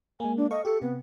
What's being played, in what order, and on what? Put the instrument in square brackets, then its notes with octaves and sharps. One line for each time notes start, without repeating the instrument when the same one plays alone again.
[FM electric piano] G#3 A#3 [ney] G#5
[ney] D4
[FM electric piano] A4 F5 C#6 [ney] D#5
[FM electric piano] G4 C#7 [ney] A4
[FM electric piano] C3 [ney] B3